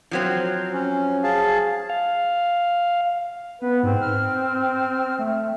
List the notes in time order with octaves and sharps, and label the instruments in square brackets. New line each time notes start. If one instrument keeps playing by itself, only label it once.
[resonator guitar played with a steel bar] F3 F#3 C4
[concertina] C#4
G#4 F5 A5
[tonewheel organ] F5
[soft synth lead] B3 [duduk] B4
[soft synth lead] G#2 [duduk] C4
[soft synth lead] F6
A3